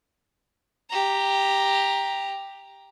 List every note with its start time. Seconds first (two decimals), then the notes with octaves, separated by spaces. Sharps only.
0.90 G4 A#5